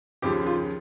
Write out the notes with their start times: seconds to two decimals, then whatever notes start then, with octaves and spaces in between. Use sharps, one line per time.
0.22 D#2 C#3 F3 G4
0.46 F4